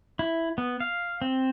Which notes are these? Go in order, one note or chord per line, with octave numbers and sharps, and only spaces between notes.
E4
B3
F5
C4